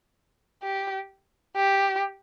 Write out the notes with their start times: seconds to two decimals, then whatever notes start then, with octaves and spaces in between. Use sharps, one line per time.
0.63 G4
1.56 G4